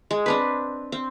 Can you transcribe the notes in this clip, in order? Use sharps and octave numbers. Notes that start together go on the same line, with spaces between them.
G#3
C4 D4 B4
C4